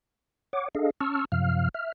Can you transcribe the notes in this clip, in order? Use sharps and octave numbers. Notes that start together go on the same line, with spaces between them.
C#5 F#5 D6
D4 G#4 A4 D#5 F5
C#4 A5 C#6 E6 F6
F#2 C3 F3 F5 F6
E5 F6